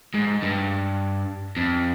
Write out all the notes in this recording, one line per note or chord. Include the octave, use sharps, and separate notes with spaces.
G#2
G2
F2